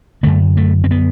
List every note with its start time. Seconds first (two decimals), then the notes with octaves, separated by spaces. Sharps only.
0.23 F#2 D3 A3
0.57 A3
0.84 C4
0.91 B3